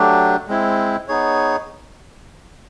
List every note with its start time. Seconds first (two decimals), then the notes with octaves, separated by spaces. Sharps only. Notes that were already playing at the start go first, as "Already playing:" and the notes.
Already playing: F#3 A3 D4 G4
0.48 G#3 C4 E4
1.08 B3 D#4 G#4 C#5